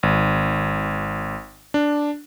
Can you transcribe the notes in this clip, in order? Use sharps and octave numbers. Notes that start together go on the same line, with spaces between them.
G#1
D4